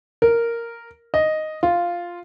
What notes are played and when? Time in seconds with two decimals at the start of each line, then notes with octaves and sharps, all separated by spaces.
0.22 A#4
1.14 D#5
1.63 F4